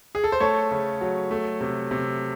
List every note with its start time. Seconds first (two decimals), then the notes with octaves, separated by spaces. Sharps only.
0.15 G#4
0.24 A4
0.32 C5
0.40 A3 A4 C#5
0.71 C#3
1.01 F#3
1.31 A3
1.61 C3
1.91 C3